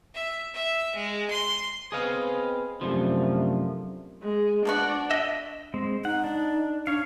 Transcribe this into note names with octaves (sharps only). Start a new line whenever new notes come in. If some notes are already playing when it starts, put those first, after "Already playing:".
E5
E5
G#3
C6
B3 C4 G#4 B4 D#5 F5
F#2 C3 F3 A3 A#3 D4
G#3
F3 B3 D4 F#4
D#5 E5
G#3 C4
D#4 F#5
D4
D4 C#5 F5